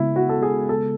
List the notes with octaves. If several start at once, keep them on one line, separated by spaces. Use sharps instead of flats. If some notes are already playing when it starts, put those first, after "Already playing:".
Already playing: C#3 G#3 B3 E4
F#4
A4
G#4
A4